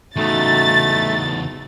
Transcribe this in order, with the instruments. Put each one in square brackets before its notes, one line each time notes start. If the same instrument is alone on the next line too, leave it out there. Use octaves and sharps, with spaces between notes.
[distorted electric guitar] E2 C#3 [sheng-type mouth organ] A3 [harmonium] D#4 F#4 [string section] A6